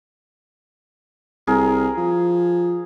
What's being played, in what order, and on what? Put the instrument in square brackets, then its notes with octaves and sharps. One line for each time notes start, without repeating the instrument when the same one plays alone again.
[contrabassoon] C2 [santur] G#4 A#4
[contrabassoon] F3